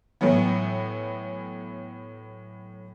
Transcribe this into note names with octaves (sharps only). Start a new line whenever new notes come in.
A2 E3 F#3 B3